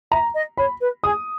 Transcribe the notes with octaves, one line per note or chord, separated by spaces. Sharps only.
E5 A#5
D#5
C#5 B5
B4
G#4 D#6